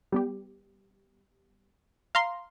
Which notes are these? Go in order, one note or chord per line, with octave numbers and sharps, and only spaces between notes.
G3 B3 G4
F5 A#5 C6